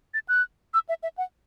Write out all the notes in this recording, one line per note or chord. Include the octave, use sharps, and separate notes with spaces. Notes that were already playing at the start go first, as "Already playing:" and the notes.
A6
F#6
E6
E5
E5
F#5